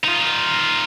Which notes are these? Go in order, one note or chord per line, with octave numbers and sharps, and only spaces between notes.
D#4 F4